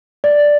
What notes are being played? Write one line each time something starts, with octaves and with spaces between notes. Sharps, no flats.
D5